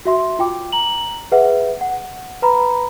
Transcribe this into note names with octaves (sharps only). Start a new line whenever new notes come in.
F#4 E5 C6
F4 G5 D6
A#5 F#7
G#4 B4 E5 F#5
F#5
B4 A#5 B5